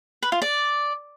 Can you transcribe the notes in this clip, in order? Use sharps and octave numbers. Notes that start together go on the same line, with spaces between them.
B4
F4
D5